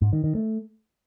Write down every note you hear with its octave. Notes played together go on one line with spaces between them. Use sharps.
G#2
D#3
D#3
A3